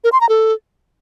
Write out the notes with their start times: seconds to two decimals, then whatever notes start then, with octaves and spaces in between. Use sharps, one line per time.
0.04 A#4
0.12 C6
0.21 A#5
0.29 A4